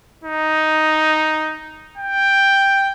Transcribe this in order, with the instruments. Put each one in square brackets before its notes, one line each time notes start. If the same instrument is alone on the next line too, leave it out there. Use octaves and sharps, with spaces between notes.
[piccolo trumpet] D#4
G5